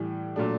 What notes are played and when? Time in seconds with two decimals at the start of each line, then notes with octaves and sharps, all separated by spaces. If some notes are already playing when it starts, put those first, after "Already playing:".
Already playing: A2 E3 G3
0.36 A#2 F#3 A3 D4